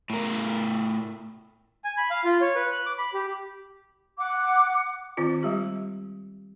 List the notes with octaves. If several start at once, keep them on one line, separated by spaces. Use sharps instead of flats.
A2 A#4
G#5
B5
F5
F4
C#5
B4
F#6
D6
B5
G4
F#5 D6
D#3 C4 F4
G3 G#3 G4